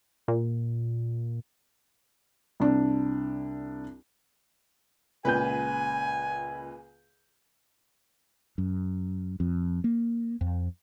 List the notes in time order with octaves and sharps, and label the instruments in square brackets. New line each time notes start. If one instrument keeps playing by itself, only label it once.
[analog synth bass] A#2
[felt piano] C2 D4
[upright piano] C#2 G6 [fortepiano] A#2 B4 [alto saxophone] G#5
[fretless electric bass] F#2
F2
A#3
F2